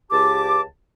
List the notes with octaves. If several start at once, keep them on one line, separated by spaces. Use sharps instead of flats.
C#2 G4 A5 D6